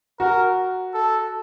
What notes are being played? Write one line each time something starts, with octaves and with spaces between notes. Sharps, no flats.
F#4 A#4
A4